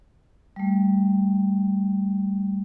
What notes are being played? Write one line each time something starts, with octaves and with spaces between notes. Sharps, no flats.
G3 A3